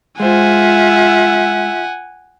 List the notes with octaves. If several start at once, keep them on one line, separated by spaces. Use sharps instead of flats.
G#3 F4 C5 E5 F#5 G#5